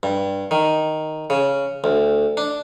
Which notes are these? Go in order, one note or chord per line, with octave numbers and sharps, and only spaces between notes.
G2
D#3
C#3
D2
D4